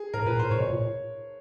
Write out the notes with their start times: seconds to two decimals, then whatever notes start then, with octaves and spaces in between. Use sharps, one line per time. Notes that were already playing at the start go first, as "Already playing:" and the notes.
Already playing: G#4
0.14 A2 A#4
0.26 A#2 B4
0.39 A2 C5
0.51 A#2 C#5
0.61 B2
0.71 A#2